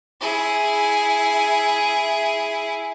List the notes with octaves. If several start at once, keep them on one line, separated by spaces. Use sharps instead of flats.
E4 G#4